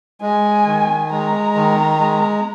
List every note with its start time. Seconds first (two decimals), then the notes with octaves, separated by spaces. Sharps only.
0.21 G#3 G#5
0.66 D#3
1.11 G#3 A#5
1.55 D#3
1.99 G#3